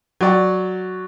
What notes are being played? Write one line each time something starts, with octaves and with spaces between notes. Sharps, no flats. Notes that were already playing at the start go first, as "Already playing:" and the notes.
F#3 D5 F#5